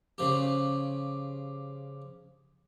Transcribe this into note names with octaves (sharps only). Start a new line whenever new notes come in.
C#3 F3 G4